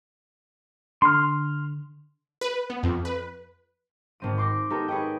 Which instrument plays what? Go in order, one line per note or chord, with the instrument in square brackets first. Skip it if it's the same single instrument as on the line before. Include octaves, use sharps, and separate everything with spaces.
[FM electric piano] D3 [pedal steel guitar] C6 F6
[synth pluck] B4
B3
F2
B4
[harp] G#1 C4 D#7
C6 D6 G6 A#6
B3 D#4 G4 A4 A#4
G#4 B4 C#5 D#5 G5